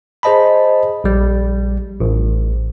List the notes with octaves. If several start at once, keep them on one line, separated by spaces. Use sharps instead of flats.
G#4 C5 D#5 A5 B5
A#1 G3
A1